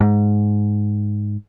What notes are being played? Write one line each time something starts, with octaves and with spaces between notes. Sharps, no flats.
G#2